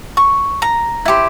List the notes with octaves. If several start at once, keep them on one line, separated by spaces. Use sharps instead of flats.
C#6
A#5
E4 G4 C5